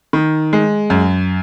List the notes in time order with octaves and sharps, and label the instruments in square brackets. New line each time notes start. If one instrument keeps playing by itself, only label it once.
[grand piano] D#3
G#3
F#2